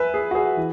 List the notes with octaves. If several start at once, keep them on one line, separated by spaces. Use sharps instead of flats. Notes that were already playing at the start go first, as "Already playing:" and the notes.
Already playing: B4 E5 G#5
G#4
F#4
G#4
E3